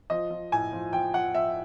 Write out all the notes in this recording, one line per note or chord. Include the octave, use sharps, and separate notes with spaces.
F3 D#5
F3
A2 G#5
F3
F3 G5
F3 F#5
F3 E5